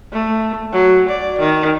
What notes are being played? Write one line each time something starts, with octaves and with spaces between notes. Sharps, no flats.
A3
F#3
D5
D#3